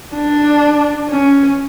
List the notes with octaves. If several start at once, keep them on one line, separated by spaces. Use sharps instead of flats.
D4
C#4